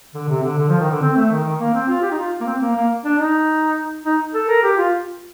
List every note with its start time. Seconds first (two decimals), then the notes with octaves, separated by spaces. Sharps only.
0.14 D3
0.29 C3
0.43 D3
0.58 D3
0.69 F3
0.79 D#3
0.90 D3
1.02 C4
1.16 A3
1.31 D#3
1.44 D#3
1.60 A#3
1.74 C4
1.88 F4
2.02 G4
2.11 D#4
2.18 F4
2.41 A#3
2.46 C4
2.61 A#3
2.76 A#3
3.04 D4
3.19 D#4
4.06 D#4
4.34 A4
4.49 A#4
4.63 G4
4.77 F4